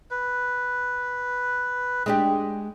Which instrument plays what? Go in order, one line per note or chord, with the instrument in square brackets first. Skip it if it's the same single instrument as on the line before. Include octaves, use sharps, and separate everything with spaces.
[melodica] B4
[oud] G#3 D4 G4